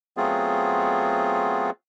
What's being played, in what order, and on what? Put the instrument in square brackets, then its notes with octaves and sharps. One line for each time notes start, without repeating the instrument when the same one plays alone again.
[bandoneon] F#3 A3 B3 C4 F4 G#4